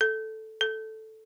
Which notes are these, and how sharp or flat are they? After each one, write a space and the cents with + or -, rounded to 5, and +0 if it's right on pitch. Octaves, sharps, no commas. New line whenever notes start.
A4 +0
A4 +0